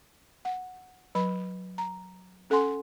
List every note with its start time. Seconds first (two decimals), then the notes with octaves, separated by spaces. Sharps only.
0.45 F#5
1.15 F#3 B4 B5
1.78 A#5
2.50 C#4 A4 F#5 G#5 C6